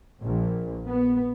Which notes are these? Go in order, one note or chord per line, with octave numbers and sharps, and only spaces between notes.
A#1
B3